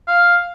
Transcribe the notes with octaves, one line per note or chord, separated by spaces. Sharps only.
F5